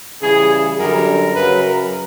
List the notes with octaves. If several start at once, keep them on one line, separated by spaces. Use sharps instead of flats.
C#3 E3 G3 G#4
F#2 D3 G3 A#4
F#2 C#3 F#3 B4
A#4